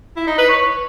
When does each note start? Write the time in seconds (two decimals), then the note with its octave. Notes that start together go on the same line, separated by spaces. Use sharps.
0.16 E4
0.27 D#4
0.38 B4
0.49 C#5